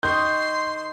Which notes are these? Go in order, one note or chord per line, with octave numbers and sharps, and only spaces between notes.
D#3 D#5 C6 C#6 G6